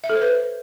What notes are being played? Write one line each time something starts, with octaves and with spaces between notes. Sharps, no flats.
E5
A4
C5
B4